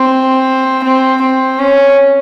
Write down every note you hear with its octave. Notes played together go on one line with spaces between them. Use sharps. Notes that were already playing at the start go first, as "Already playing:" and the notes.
Already playing: C4
C4
C4
C#4